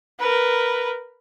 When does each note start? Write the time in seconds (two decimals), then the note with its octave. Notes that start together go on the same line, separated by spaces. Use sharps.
0.19 A#4 B4